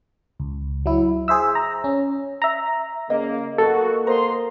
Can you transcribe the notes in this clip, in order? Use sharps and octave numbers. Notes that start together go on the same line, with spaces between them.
C#2
F#3 E4
G#4 C5 E5 E6
A#5
C#4
E5 A#5
C#3 A#3 D#5
A#3 B3 D#4 F#4 A4
A#3 C5 D#5 A#5 C6